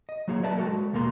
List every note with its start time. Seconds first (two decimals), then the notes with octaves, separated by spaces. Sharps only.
0.09 D#5
0.28 F#3 A#3 F4 G#4 C#5
0.43 A#4 B4 D5 E5 A5
0.57 G#3 F#4 A4 A#4 G5
0.93 D#2 B2 A#3 A#4 C6